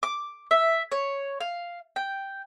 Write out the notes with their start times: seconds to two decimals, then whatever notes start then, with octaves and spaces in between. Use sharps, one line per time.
0.03 D6
0.51 E5
0.92 C#5
1.40 F5
1.96 G5